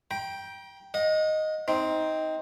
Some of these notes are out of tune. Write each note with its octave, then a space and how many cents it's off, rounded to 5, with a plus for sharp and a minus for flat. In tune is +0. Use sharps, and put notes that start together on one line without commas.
G5 +0 A#5 +40
D#5 +0 F#5 -45
C4 +0 D#4 +20